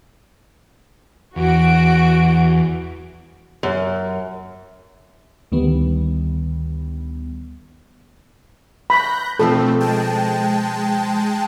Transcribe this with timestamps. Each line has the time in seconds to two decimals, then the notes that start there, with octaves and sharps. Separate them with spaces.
1.36 E2 F#4 D7
3.63 F#2
5.52 D2 D#3 G3 B3
8.90 B5 C#6 F#6 G6 A#6
9.39 B2 F3 A3 C4 A4
9.80 G#3 G5 A5